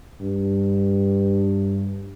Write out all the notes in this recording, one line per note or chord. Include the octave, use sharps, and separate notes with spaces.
G2